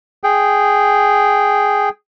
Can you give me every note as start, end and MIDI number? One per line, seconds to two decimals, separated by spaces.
0.24 1.89 68
0.24 1.89 79